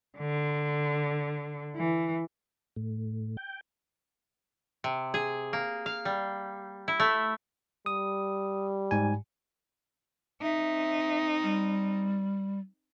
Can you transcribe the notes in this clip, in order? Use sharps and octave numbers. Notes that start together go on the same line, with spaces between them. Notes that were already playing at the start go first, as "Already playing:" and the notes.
D3
E3
A2
G5
C3
G#4
A#3
F5
G3
E4
A3
G3 D#6
G#2 G#5
C4 D#4 E5
G3